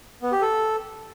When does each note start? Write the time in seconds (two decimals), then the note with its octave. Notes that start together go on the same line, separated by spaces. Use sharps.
0.22 B3
0.32 G4
0.41 A4